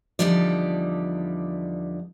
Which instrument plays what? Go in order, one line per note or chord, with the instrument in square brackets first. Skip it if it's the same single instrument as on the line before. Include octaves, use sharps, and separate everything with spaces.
[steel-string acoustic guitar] E2 D3 F3 G3 D#4 D5